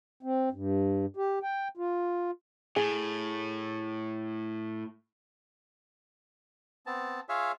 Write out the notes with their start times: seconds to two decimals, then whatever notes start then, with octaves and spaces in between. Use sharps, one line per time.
0.23 C4
0.52 G2
1.17 G4
1.43 G5
1.77 F4
2.76 A2 G#4
6.86 B3 C4 A5
7.29 F4 G#4 C#5 E5 F5